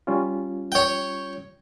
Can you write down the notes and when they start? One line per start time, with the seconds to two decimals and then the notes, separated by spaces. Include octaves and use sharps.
0.07 G3 C#4 F4
0.72 C#5 G5